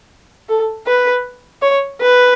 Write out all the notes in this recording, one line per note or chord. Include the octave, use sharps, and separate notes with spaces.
A4
B4
C#5
B4